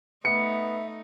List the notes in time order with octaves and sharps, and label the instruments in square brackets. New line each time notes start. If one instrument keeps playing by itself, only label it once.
[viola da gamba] A3 D#4 [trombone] B3 [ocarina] E5 [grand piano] C#7